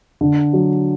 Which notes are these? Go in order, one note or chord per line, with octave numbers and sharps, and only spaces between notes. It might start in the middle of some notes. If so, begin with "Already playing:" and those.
D3
F#3